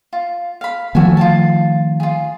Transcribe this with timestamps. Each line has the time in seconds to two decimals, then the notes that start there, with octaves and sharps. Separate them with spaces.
0.13 F4
0.61 F5 B5
0.95 D#3 F3 A3 F#4 A4 G#5
1.17 F4 F#4 A5
2.00 F4 G#4